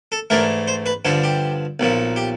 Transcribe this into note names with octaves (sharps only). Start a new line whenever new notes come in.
A4
G#2 E3 A3 D4 A#4
C5
B4
G2 D3 F3 A4
G4
B1 A#2 F3
G4